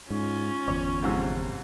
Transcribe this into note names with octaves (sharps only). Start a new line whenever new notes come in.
G#2 C#4 F4
G1 E2 C#5
F2 G#2 C3